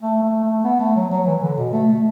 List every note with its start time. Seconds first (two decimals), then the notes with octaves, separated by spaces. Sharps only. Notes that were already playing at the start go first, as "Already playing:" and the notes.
0.02 A3
0.23 A3
0.43 A3
0.64 B3
0.79 A3
0.96 F#3
1.11 F#3
1.27 E3
1.41 D3
1.58 B2
1.73 A3
1.89 A3